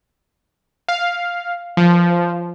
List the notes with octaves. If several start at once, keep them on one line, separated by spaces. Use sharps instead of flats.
F5
F3